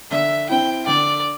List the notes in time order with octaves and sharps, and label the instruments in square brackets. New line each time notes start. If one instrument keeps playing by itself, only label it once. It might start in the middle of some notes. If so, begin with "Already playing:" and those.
[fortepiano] D3 [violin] E5
[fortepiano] C4 E4 [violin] G5
[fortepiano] D3 [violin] D5